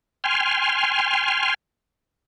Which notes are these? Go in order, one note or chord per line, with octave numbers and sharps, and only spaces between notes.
G5 G#5 C6 F6